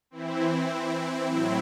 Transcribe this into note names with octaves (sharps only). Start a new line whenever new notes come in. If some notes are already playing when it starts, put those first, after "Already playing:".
E3 C4 E4
A2 F#3 C4 E4